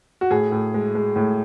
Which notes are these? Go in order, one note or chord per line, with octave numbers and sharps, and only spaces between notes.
F#4
A2 G#4
A2
G#3
G#3
A2